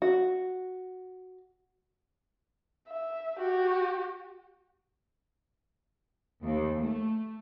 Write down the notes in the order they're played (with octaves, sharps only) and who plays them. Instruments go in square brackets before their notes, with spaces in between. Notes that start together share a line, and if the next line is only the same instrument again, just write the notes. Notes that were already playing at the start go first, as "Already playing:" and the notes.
[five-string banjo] F#4
[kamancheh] E5
F#4 G4
[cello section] D#2
A3